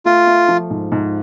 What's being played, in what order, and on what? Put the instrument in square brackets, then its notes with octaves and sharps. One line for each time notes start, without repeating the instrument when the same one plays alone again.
[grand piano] A3 [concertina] F4
[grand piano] A3
F3
G#2
G#2